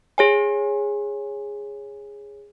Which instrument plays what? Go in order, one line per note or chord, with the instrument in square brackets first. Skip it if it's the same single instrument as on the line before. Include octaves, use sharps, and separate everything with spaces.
[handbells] G#4 C#5 G#5